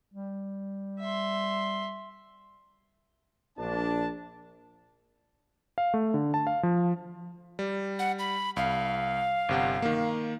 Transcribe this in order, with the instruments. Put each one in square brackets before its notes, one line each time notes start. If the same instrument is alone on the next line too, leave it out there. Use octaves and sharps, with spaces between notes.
[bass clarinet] G3
[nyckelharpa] E5 C6
[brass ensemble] A#1 D4 A5
[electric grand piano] F5
A3
D3
A5
F5
F3
G3
[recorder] F#5
B5
[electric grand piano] C2 [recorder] F5
[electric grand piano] G1 C3 F#5
D#3 A#3